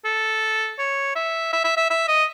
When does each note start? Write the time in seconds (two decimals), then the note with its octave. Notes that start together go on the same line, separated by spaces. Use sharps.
0.05 A4
0.79 C#5
1.16 E5
1.53 E5
1.64 E5
1.77 E5
1.90 E5
2.08 D#5